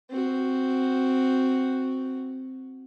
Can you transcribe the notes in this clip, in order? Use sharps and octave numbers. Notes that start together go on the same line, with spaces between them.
C4 F#4